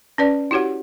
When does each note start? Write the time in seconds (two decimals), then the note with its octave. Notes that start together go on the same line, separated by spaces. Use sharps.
0.18 C#4 B4 D5
0.51 E4 F#4 G4 C#5 F#5